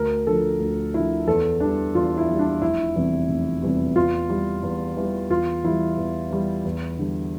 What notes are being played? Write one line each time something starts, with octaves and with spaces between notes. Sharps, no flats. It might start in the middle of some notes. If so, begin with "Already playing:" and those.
Already playing: D2 A#4
D3 F3 A4
D2
D3 F3 E4
E2 A4
E3 G3 D4
E2 F4
E4
E3 G3
D4
F1 E4
E2 C3 E3 G3
F1
E2 C3 E3 G3
E2 F4
E3 G3
E2
E3 G3
E2 F4
E3 G3 E4
E2
E3 G3
E2
D3 G3